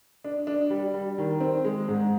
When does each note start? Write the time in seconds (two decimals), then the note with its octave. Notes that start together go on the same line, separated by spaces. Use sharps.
0.24 D4
0.47 D4
0.70 G3
0.94 G3
1.18 D#3
1.40 C4
1.65 G#3
1.88 G#2